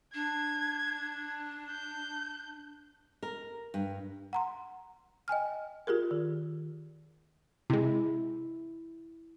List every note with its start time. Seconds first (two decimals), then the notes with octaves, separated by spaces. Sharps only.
0.14 D4 G#6
1.71 G6
3.23 A#4
3.74 G2
4.33 F#5 A#5 C6
5.28 D#5 G5 G#5 F6
5.87 F4 G4 G#4 A#4
6.11 D#3
7.70 C3 G#3 E4